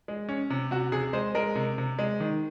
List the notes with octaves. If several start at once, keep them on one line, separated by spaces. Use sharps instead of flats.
G#3
C#4
C3
C3 F#4
C3 G#4
G#3 C5
G#3 A#4
C3
C3
G#3
D#3